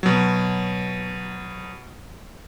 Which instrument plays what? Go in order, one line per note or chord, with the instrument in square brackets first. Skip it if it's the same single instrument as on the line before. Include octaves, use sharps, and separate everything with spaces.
[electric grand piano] B2 F#3